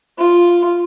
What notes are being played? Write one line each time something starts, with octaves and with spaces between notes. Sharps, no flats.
F4